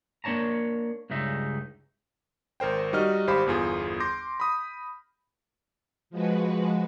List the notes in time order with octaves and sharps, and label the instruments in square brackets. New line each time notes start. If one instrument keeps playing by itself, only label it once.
[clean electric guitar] A#3 D4 C#5 A5 A#5
C#2 G2 C#3 D#4 E5
[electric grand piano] G#1 A#4 C5 G5
G3 D#4 F#4 D#5 F6
G#1 G4 C5 F5 B5
G1 E2 F4 G#4
C6 D6 G6 A#6
B5 D#6
[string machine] F3 G#3 F#4 B4